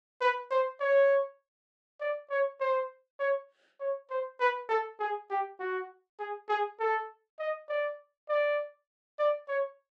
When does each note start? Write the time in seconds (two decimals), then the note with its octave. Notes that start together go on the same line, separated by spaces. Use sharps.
0.21 B4
0.51 C5
0.80 C#5
2.00 D5
2.30 C#5
2.60 C5
3.20 C#5
3.80 C#5
4.10 C5
4.40 B4
4.69 A4
4.99 G#4
5.30 G4
5.60 F#4
6.19 G#4
6.49 G#4
6.79 A4
7.39 D#5
7.69 D5
8.29 D5
9.19 D5
9.48 C#5